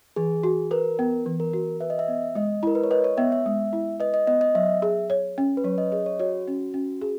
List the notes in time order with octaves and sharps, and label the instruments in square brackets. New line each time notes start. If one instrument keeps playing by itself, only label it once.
[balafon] E3 [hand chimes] G#4
[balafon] F#4
[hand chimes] A#4 [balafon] B4
[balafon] B3
E3
[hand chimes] A#4
[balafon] F#4
[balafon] B4 [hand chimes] E5
[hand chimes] D#5
E5
[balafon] B3
[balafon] G#3 [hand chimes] D#5
[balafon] E4 [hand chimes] A#4
[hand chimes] B4
C#5
[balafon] B4 [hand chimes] D#5
[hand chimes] C#5
[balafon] B3 [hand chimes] E5
[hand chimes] E5
[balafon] G#3
E4
[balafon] B4 [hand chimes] D#5
[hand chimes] D#5
[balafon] B3 [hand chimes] D#5
[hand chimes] D#5
[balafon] F#3 [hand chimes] E5
[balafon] G#4
C#5
C#4
[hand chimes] B4
[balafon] F#3 [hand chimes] C#5
[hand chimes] D#5
[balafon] G#4 [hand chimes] D#5
[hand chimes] C#5
[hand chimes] F#4 [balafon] C#5
[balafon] C#4
C#4
G#4